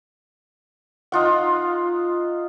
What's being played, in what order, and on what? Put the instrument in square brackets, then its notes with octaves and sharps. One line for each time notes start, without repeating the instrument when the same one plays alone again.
[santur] D#4 F4 F#5